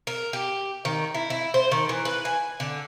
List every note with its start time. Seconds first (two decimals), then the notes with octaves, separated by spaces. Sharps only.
0.07 A#4
0.33 G4
0.85 D#3
1.15 E4
1.30 E4
1.54 C5
1.71 D#3
1.89 E3
2.05 B4
2.25 G#5
2.60 D3